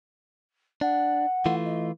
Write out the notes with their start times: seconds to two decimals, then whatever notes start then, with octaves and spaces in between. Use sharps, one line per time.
0.81 D4 F#5
1.46 E3 A3 F4
1.65 D#5